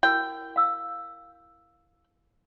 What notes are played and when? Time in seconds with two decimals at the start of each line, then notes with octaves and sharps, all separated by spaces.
0.03 E4 F#4 A#4 G5
0.56 F5 E6